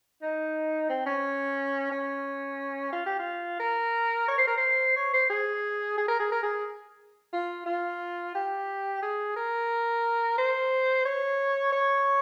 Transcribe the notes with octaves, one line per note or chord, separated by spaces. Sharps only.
D#4
C4
C#4
C#4
F4
G4
F4
A#4
C#5
C5
A#4
C5
C#5
C5
G#4
G#4
A#4
G#4
A#4
G#4
F4
F4
G4
G#4
A#4
C5
C#5
C#5